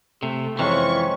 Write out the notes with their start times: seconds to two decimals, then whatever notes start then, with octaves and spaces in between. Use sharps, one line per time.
0.23 C3 A3
0.59 F2 C3 E3 G#3 C#4 C#6